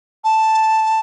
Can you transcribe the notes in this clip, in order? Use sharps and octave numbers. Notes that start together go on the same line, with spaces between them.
A5